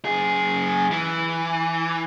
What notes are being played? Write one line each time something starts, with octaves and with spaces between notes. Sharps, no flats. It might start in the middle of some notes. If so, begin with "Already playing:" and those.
F#2 G#4
E3